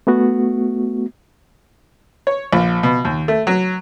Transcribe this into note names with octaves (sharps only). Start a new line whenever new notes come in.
A3 B3 F#4
C#5
A#1
B2
D#2
A3
F#3